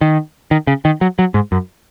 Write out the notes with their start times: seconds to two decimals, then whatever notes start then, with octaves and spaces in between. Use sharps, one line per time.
0.01 D#3
0.51 D#3
0.67 C#3
0.85 D#3
1.01 F#3
1.19 F#3
1.34 G#2
1.52 F#2